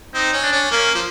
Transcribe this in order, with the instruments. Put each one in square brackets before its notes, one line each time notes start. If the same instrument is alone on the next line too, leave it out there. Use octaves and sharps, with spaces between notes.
[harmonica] C4 [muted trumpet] D#4
[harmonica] C#4
[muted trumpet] D4
[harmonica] C#4
[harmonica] A#3 [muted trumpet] C#4
[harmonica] F3